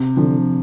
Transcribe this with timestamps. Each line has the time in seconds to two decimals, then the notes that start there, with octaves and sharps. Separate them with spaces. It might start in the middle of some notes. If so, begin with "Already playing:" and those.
Already playing: C3
0.16 D3 F3